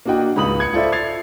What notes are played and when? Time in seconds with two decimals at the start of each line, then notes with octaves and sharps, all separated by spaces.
0.05 A#3 D4 F#4 D#5 G5
0.36 C#2 G#2 B5 D#6 F#7
0.60 G#6 C#7
0.73 F4 A4 C5 D5 E5
0.92 G#6 A6 C7 F7